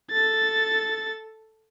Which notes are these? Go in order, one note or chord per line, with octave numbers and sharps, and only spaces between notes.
A4 A6